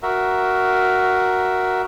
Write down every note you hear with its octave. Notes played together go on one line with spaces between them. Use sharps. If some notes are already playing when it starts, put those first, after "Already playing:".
F#4 A#4 E5